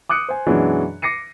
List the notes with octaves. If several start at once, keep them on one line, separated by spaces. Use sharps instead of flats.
D6 D#6 F#6 C#7
C5 G#5
F#2 B2 E3 F#3 G#3 D4
D6 A#6 C7 C#7 D#7